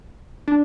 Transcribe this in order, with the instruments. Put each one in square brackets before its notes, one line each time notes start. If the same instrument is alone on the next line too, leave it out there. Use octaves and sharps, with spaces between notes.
[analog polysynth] D4